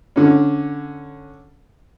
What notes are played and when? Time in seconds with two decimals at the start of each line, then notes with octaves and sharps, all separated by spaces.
0.16 D3 C#4